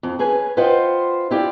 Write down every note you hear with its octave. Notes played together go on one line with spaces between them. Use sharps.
F2
C#4 G#4 B4 G#5
F4 B4 C5 D#5 F#5 G5
E4 F4 G4 D5